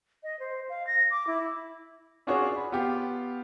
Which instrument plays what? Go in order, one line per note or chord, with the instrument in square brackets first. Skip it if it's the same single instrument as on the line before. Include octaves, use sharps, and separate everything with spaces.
[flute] D#5
C5
F5
A#6
D6
E4
[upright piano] C#4 D4 F4 F#4 G#4 C#5
B5
B3 F4 G4 F5